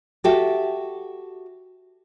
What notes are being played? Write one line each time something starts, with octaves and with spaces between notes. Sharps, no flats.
F#4 G4 A4 E5 G5